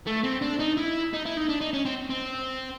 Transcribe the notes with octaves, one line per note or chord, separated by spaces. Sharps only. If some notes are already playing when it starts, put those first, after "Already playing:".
A3
C4
D4
D#4
E4
D#4
E4
D#4
D4
D#4
C#4
C4
C4